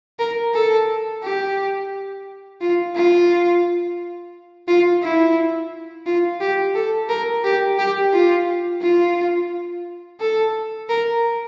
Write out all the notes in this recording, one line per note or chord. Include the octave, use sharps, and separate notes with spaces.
A#4
A4
G4
F4
F4
F4
E4
F4
G4
A4
A#4
G4
G4
F4
F4
A4
A#4